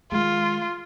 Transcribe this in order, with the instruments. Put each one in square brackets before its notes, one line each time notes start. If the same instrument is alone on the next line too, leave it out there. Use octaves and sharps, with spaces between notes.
[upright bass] D#3 G#3 [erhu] F4